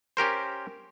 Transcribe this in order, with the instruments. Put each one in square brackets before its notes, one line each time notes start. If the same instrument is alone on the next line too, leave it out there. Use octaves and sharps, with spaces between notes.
[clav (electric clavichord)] C#4 G4 A#4 C5